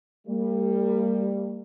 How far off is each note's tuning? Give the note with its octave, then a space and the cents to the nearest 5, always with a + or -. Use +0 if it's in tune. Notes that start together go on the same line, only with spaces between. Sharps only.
G3 +15 A#3 -35